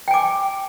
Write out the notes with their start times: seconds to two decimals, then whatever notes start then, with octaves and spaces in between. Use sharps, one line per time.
0.08 G5
0.11 G#5
0.14 D6